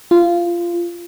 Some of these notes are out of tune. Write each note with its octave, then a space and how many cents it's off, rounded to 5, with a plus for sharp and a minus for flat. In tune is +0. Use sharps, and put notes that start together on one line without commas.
F4 -15